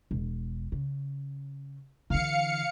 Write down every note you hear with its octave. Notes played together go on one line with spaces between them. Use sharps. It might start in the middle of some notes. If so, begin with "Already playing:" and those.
E1
C#3
D3 E3 F5 C#7